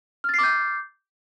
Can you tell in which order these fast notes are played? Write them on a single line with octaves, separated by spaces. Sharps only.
F6 A6 C7 D6 G6